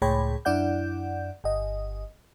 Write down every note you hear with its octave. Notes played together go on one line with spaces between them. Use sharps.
C#2 A2 G#4 C#5 G5 B5
F#2 D4 E4 D5 F#5 G6
G1 D#5